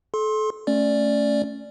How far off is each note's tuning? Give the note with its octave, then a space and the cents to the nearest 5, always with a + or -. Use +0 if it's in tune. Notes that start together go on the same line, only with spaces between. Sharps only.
A4 -30 C6 +20
A3 +0 C#4 +0 D5 +0